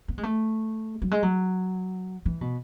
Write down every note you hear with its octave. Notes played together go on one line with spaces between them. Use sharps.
B3
G#3
A3
F#3
G#3
F#3
E3
B2